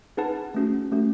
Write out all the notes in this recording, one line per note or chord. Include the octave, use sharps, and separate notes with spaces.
D#4 G#4 B4 F#5 A5
A3 C#4 F#4
A3 C#4 F#4